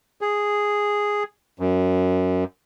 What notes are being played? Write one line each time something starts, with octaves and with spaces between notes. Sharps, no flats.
G#4
F#2